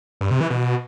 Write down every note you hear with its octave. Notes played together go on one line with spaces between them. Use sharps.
G2
C3
E3
B2